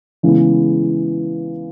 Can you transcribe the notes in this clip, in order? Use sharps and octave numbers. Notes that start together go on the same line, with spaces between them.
C#3 E3 G#3 B3 E4